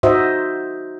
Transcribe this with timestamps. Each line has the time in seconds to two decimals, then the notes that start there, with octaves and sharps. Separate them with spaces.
0.03 D#4 F#4 C5 D#5 E5